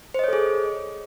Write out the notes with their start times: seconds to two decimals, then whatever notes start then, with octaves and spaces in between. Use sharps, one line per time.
0.14 C5
0.19 D#5
0.24 C#5
0.28 A4
0.33 G#4